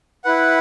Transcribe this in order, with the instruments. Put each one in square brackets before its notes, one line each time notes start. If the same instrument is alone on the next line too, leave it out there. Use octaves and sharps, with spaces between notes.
[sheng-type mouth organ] E4 B4 F#5